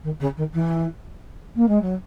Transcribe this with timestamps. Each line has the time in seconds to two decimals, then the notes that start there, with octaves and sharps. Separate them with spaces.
0.03 D#3
0.20 C#3
0.36 D#3
0.53 E3
1.55 A#3
1.68 G#3
1.81 F#3